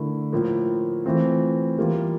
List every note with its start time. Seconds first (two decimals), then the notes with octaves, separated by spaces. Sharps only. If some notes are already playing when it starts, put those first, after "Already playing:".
Already playing: D3 A3 E4 A#4
0.32 A2 F3 A#3 F4
1.05 E3 A3 C4 F4
1.78 E3 G3 A#3 F4